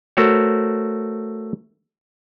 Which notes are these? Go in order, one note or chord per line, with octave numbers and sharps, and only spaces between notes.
A3 F#4 A#4 C5 C#5